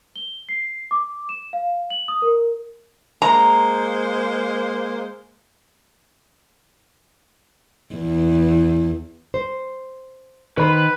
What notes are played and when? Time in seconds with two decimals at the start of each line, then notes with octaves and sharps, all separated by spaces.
0.16 G7
0.49 C7
0.91 D6
1.29 E7
1.53 F5
1.90 F#7
2.08 D#6
2.22 A#4
3.22 G#3 A#3 C5 A#5
7.95 E2
9.34 C5
10.58 D#3 B4 C5 B5